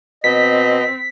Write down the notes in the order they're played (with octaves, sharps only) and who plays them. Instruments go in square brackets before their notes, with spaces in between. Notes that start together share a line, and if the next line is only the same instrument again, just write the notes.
[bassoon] B2 [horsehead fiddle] C4 [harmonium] D#5 [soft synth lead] B6